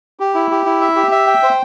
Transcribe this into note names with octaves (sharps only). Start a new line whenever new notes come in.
G4
E4
G4
E4
E5
G4
E5
G5
C5